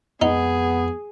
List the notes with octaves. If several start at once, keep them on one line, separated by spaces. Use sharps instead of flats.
F2 G#3 B3 D#4 G#4